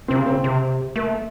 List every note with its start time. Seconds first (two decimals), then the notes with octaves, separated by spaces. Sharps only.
0.08 C3 C4
0.18 C#3
0.26 C4
0.44 C3
0.96 A3 A#3